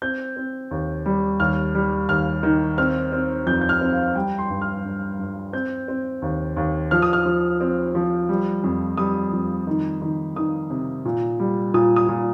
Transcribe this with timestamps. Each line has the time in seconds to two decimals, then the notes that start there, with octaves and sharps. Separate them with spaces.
0.02 C4 G6
0.37 C4
0.71 D#2
1.06 G3
1.40 D#2 F6
1.75 G3
2.09 D#2 F6
2.43 D#3
2.78 C4 F6
3.12 C4
3.47 F2 G6
3.61 G6
3.69 F6
3.81 C4
3.93 F5
4.15 G3 G5
4.39 C6
4.50 G2
4.61 F6
4.85 G2
5.19 G2
5.53 C4 G6
5.88 C4
6.22 D#2
6.57 D#2
6.91 F3 F6
7.02 D#6
7.13 F6
7.25 F3
7.61 C4
7.95 F3
8.29 G3
8.64 F2
8.98 G3 D#6
9.33 F2
9.67 D#3
10.02 D#3
10.36 D#3 D#6
10.70 C3
11.05 A#2
11.39 G3
11.74 A#2 D#6
11.96 D#6
12.09 A#2